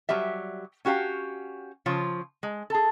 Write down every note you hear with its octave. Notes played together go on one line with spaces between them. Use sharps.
F#3 G3 G4 E5
C#4 F#4 G4 D5 F5
C#3 F3 F4 C#5
G#3
G#4 A4